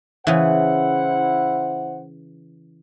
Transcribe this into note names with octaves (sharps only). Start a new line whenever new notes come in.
C#3 E3 E4 C5 F#5